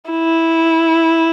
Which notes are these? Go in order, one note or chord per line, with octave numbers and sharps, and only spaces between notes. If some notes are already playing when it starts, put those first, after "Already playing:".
E4